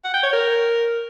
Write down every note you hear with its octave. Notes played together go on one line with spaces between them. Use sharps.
F#5
G5
C#5
A#4